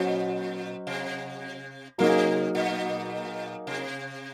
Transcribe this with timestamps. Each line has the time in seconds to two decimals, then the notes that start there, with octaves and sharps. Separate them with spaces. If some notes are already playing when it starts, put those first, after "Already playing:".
Already playing: A#2 F#3 C#4 F#4 C5 D#5
0.87 C3
1.98 C3 F#3 A#3 D#4 G#4
2.55 A#2
3.67 C3